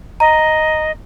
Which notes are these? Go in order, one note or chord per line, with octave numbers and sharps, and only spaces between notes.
D#5 A#5